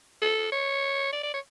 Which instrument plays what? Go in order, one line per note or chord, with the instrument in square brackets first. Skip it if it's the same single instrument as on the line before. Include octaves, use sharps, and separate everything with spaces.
[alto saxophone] A4
C#5
D5
D5
C#5